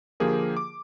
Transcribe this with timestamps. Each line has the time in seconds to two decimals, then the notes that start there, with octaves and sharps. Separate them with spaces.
0.20 D3 F3 A#3 G4 G#4 A#4
0.57 D6